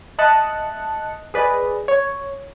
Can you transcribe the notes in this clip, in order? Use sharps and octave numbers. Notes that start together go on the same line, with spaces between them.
D#5 E5 A5 F#6 C#7
G#4 B4 D5 D#5
C#5